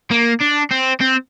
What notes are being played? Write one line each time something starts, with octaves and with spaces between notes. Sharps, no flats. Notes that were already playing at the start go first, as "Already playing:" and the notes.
A#3
D4
C4
C4